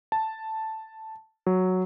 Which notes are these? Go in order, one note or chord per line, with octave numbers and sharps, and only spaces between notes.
A5
F#3